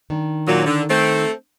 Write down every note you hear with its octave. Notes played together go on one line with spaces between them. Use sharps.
D#3 D4
A#2 F#3
D3
A3 C4